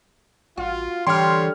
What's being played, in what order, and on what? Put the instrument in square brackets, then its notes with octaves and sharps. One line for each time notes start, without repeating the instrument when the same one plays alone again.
[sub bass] A1 [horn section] F4 [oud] F#4
[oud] D3 G4 [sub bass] E3 [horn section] G3 C#5 [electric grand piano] C6 F6